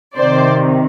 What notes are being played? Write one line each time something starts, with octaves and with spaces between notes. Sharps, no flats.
C3 D#3 C5 D5